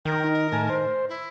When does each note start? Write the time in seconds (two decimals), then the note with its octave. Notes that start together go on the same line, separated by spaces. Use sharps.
0.05 D#3 A#4 G5
0.24 D#4
0.52 A2 G#5 A5
0.69 C5
1.09 E4